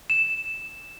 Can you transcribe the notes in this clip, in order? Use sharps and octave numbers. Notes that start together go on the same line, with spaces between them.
E7